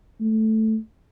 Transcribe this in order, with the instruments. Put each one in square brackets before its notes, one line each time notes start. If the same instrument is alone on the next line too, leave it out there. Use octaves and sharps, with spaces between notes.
[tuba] A3